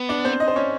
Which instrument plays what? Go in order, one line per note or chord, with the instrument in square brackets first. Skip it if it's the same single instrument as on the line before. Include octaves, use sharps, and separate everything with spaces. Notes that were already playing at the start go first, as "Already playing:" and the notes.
Already playing: [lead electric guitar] B3
[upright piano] D4 D5
C4 C5
D#4 D#5
C5
C#4 C#5